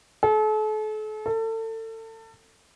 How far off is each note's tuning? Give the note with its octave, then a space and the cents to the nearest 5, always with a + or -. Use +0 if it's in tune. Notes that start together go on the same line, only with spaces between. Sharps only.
A4 -40
A4 +30